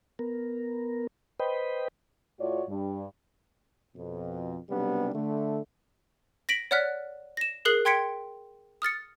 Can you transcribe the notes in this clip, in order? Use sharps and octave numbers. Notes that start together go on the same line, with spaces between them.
B3 A#4
B4 C5 D#5 G5 B5
A2 F4 F#4 C#5 D5
G2
F2 B2
B1 C3 G3 B3 D4
D3 A3
A#6 B6 D7 F#7
C#5 D5 F#5 F6 F#6 B6
A#6 E7
G#4 A#4 D#6 F#6 C7 F#7
G5 C6 G#6 B6 C#7 D7
D#6 F6 A6 C#7